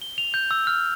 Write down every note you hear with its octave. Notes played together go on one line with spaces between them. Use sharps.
G7
F7
G6
E6
F6